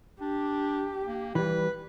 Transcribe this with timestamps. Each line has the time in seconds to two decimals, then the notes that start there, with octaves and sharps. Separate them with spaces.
0.21 D4 G4
1.06 A#3
1.35 E3 G3 B4